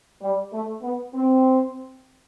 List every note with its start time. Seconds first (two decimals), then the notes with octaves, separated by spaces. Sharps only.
0.21 G3
0.52 A3
0.82 B3
1.13 C4